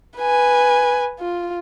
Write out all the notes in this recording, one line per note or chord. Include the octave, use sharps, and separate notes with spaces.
B4 G#5
F4